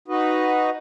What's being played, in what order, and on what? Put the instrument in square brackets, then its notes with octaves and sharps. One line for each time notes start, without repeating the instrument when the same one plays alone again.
[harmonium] D#4 F#4 B4 D#5